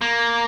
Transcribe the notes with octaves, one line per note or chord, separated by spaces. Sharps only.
A#3